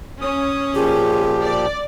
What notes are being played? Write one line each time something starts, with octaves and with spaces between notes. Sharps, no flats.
C#4 D#6
A#2 F3 G4 G#4
D5